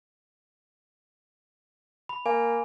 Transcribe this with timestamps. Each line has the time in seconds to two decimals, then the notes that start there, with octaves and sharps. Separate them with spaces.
2.09 B5
2.26 A#3 G#5